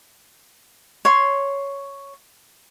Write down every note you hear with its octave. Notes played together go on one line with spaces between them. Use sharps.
C#5 C6